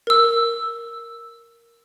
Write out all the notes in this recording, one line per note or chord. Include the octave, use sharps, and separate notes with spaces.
A#4 E6